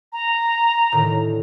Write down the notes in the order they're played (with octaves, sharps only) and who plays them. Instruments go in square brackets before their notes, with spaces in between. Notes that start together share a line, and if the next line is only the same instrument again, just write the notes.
[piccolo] A#5
[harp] A2 D3 D#3